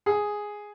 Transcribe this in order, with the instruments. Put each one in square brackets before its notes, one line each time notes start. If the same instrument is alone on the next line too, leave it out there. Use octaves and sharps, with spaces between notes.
[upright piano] G#4